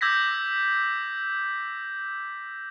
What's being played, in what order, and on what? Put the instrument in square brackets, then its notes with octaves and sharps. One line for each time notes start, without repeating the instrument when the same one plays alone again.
[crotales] D6 E6 G6 G#6 A#6 B6